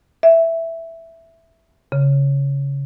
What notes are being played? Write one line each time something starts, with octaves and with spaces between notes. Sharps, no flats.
E5
C#3